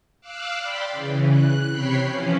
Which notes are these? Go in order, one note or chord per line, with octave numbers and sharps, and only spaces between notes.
F5 D6 E6 F#6
D5 G5 B5 C6
C#3 E3
F#6
C3 C#5 G5 B5 C7
E3 F3 C#4